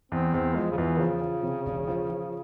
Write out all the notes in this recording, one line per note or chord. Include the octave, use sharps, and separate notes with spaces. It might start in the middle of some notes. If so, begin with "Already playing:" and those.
E2 C4
E2 C4
F3 G#3
C#3
E2 E3
C#3 F3
F3
C3
E1
F3
F3